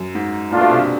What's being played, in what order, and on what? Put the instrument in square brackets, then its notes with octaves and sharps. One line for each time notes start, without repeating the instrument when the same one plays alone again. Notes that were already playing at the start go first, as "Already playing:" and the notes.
Already playing: [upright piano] F#2
G#2
[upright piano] A#2 [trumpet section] A3 D4 F4
[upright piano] B2
C3
D3